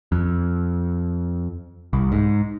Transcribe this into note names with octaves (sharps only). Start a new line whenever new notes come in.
F2
C2
G#2